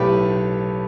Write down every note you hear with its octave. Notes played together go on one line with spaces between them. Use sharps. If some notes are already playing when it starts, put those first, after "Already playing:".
Already playing: B1 A2 A3 G4 B4